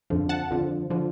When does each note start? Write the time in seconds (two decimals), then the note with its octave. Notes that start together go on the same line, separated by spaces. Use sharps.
0.10 F2 D3 F3
0.29 F#5 A5
0.51 F2 D3 F3
0.90 D3 F3